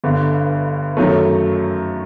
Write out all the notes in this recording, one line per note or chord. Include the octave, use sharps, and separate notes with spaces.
G1 G2 D3
F#2 D#3 F#3 A3